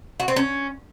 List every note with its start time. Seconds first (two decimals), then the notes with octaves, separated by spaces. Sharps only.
0.20 F#4
0.28 C4
0.36 C#4